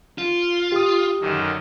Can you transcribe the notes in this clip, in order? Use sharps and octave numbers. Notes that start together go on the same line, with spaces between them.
F4
G4 D#6
F#2 D3 D#3